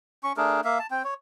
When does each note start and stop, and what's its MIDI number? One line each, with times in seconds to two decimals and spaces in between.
0.24 0.33 61
0.24 0.33 85
0.37 0.61 57
0.37 0.61 62
0.37 0.61 68
0.37 0.61 70
0.64 0.79 58
0.64 0.79 76
0.64 0.79 77
0.79 0.87 81
0.91 1.03 60
0.91 1.03 79
1.04 1.14 73